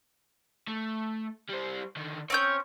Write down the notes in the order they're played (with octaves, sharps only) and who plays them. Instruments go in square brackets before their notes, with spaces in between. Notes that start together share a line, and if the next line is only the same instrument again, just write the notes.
[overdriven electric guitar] A3
G3 C5
D3 D#3
[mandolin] C4 C#4 G6 [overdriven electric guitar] C#5